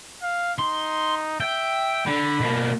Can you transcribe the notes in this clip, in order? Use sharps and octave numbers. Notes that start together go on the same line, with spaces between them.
F5
D#4 C6
E5 G5
D3 B5
B2 A#3